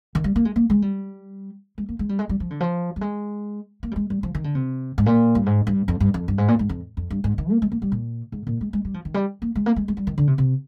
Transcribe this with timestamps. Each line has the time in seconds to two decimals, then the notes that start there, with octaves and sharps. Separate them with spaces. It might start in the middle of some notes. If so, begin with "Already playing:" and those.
0.15 D#3
0.24 G3
0.36 A#3
0.45 G#3
0.56 A#3
0.70 G#3
0.82 G3
1.78 G#3
1.89 A#3
1.99 G#3
2.09 G3
2.19 G#3
2.29 G3
2.40 F3
2.50 D3
2.60 F3
2.96 G3
3.01 G#3
3.83 A#3
3.91 G3
3.96 G#3
4.10 G3
4.23 F3
4.35 D#3
4.44 D3
4.55 C3
4.98 G#2
5.06 A#2
5.35 G2
5.46 G#2
5.67 G2
5.88 F2
6.00 G2
6.14 F2
6.28 G2
6.38 G#2
6.48 A#2
6.59 G#2
6.69 F2
6.97 F2
7.10 G2
7.24 G#2
7.38 D#3
7.51 A#3
7.62 G#3
7.72 A#3
7.82 G3
7.92 A#2
8.32 G#2
8.47 A#2
8.61 G#3
8.73 G#3
8.85 G3
8.94 F3
9.05 D#3
9.14 G3
9.42 A#3
9.55 G#3
9.66 A#3
9.76 G#3
9.88 G#3
9.97 G3
10.07 D#3
10.18 D3
10.27 C3
10.38 C3